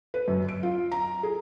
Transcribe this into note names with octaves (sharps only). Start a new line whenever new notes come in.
B4
F#2
D7
F4
A#5
G#4